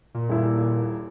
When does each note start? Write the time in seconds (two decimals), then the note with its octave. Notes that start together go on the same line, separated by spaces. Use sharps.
0.14 A#2
0.29 D#1 E4